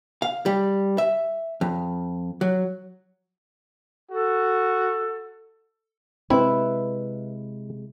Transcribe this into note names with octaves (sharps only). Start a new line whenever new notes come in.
F5
G3
E5
F2
F#3
F#4 A4
C3 G#3 C4 E4 B4 E5